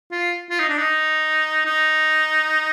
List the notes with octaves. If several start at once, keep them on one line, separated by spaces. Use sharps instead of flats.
F4
F4
D#4
D4
D#4
D#4